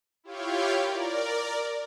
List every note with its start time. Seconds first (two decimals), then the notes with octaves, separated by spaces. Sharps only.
0.24 E4 F4 G4 C#5 F5 G5
0.79 A#4 D5